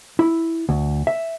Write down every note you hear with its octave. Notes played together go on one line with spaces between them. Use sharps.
E4
D2
E5